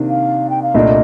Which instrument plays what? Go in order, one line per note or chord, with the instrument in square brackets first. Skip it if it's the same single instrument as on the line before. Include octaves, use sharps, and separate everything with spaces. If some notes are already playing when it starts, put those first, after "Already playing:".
Already playing: [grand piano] C3 D#3 A#3 D4
[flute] F5
G5
F5
[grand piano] C2 A#2 A3 D4 [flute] D#5